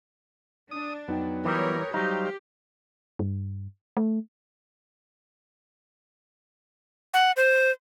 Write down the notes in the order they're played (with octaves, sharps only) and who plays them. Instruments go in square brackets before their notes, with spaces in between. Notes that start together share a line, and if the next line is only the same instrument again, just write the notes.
[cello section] D4 [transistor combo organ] D#6
[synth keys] F2 D#4 G5 [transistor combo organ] F#3 B3
[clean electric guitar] E3 G3 [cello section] A#4 B4 C#5 [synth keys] G5 D#6 G6
[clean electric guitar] F#3 D#4 [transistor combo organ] G3 C5 F5 [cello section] G4
[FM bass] G2
A3
[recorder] F#5
C5